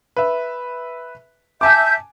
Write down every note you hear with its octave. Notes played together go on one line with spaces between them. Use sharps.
B4 E5
E5 G#5 A5 D6 G6